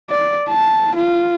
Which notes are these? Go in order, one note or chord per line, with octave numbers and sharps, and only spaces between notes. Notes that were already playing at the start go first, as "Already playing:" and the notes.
D5
A5
F4